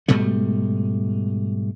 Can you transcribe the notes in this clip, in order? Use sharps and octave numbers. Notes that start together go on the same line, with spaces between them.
G#2 B2 G3 A3